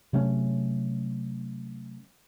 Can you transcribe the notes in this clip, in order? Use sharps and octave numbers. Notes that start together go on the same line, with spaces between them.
C3 F#3 A3 C#4